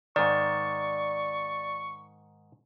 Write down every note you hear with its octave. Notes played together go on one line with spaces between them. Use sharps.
G#2 D#3 D5 C#6